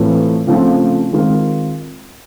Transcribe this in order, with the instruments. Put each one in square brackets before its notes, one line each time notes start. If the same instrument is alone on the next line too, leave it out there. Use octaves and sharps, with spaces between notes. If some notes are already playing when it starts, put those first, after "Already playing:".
Already playing: [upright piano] A2 E3 A3 C4 F4
C#3 F3 A3 C4
D#3 G#3 C4 F4 A#4